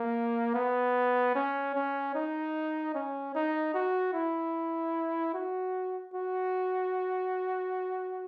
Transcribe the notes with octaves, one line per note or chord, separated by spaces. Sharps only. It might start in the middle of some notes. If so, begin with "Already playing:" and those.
Already playing: A#3
B3
C#4
C#4
D#4
C#4
D#4
F#4
E4
F#4
F#4